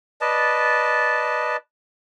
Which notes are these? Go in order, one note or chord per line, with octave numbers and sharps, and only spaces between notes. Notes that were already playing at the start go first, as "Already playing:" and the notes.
B4 D5 D#5 A5